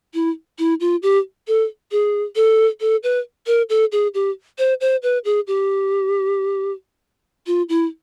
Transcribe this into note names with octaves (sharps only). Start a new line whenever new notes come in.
E4
E4
F4
G4
A4
G#4
A4
A4
B4
A#4
A4
G#4
G4
C5
C5
B4
G#4
G4
F4
E4